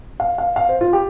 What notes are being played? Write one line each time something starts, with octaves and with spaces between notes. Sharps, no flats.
F5
F5
F5
C5
F4
G4